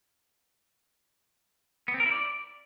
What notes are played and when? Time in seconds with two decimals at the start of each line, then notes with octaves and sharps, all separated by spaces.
1.88 B3
1.94 C4
2.00 A#4
2.06 E4
2.12 D5